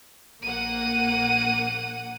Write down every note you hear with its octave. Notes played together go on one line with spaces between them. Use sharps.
A#1 A#3 F#5 D#7